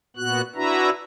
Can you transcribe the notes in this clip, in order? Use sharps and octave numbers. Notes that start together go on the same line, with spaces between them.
A#2 B3 F#4 F#6
D4 E4 F#4 B4 E5 A#5